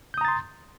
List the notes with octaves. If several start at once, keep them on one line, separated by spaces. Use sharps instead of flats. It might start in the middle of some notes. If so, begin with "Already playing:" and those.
A#5 C6 D#6 G6 A6